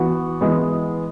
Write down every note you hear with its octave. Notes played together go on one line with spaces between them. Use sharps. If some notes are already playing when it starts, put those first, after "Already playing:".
Already playing: E3 B3 F#4
E3 G#3 B3